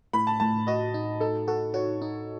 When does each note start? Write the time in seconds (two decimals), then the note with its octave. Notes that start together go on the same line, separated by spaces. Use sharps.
0.13 A2 B5
0.27 A5
0.40 A2 A5
0.67 F#4 D#5
0.94 D#4
1.20 D#4 A4
1.48 F#4 A4
1.74 F#4 C#5
2.02 D#4